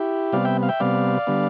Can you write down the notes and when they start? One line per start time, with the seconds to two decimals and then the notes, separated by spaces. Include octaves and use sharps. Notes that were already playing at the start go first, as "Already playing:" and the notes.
Already playing: E4 G4
0.33 C3 G3 B3 D5 F5
0.45 E5 G5
0.63 F5
0.69 E5 G5
0.80 C3 G3 B3 D5 F5
1.27 D3 G3 B3